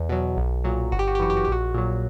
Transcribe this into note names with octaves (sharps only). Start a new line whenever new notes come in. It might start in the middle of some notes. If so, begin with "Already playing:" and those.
Already playing: E2
B2 F#3
B1
A#2 F#3
G1 F#4
G4
F#4
G4
F#2 E3 F#4
G4
F#4
G4
A#1 F#4
A#2 F#3